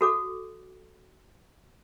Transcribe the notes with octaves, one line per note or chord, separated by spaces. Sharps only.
F#4 A4 D6